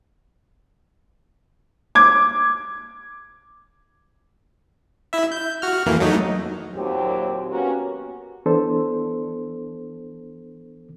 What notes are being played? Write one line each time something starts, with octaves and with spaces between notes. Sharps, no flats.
D6 G#6
E4 E5
G6
F#4 F6
F2 E3 A#3
F#3 A3 D#4
D#2 A#2 F#3 C4 G4
A#3 B3 C#4 F#4 G4 A#4
E3 B3 D4 A4 C5